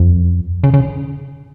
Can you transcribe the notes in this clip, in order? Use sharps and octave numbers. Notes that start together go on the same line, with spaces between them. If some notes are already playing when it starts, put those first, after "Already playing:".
Already playing: F2
C#3
C#3